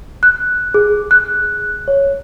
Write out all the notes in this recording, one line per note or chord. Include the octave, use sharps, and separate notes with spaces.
F#6
G#4
F#6
C#5